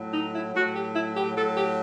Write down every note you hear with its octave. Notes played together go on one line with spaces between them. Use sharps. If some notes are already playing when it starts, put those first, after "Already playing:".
Already playing: A2 F#3
D#4
E4
A2 F#3 F#4
G4
E4
G4
A2 F#3 A4
G4